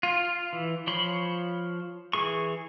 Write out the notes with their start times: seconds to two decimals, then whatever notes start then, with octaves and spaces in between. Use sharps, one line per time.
0.03 F4
0.53 E3
0.87 F3 C5 C#5 B5 C6
2.13 E3 G#4 C#6